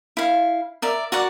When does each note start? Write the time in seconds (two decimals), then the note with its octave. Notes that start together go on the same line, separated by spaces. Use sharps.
0.17 E4 F5
0.82 A#4 D5 E5
1.12 F#4 A#4 D5 F#5